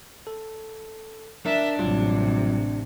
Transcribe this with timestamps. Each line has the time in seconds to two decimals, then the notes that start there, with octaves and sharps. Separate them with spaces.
0.27 A4
1.46 D4 A#4 E5
1.79 A1 C3 F#3 G3 F4